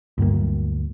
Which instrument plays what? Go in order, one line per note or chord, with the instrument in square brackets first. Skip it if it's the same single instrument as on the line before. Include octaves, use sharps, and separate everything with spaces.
[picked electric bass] D2 G2 F#3 A#3